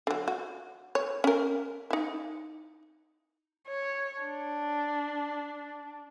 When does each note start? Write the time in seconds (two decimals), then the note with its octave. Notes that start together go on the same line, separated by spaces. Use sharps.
0.07 D3 F#3
0.28 F#4
0.95 C#5
1.24 C#4 A#4
1.90 D#4 E4
3.67 C#5
4.21 D4